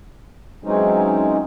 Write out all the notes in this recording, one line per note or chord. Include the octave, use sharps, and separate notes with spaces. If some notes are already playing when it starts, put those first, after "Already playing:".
E3 F#3 G#3 C4 C#4 D#4